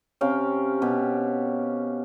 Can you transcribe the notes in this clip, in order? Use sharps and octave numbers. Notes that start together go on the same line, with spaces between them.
C3 C#4 F5 G5
B2 G4